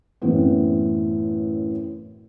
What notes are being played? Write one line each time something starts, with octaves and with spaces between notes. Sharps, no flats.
F#2 A2 E3 B3 C4